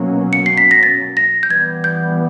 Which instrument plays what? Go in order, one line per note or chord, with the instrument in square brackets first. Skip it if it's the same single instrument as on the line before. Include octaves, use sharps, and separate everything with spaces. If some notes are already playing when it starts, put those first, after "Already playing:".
Already playing: [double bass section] B2 F#3 A#3 C#4
[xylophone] C#7
C7
B6
A#6
A6
A#6
G6
[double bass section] E3 G3 B3 [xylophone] G#6
[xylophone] G6